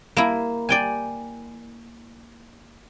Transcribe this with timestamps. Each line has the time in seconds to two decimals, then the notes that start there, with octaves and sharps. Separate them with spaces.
0.16 A#3 E4
0.69 D5 G5 G#5